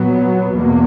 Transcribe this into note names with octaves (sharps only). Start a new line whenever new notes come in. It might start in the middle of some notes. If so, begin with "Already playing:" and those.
Already playing: A#2 F#3 B3
E2 B2 A#3